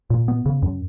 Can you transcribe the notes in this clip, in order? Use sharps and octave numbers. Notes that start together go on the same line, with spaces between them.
A#2
B3
C#3
F#2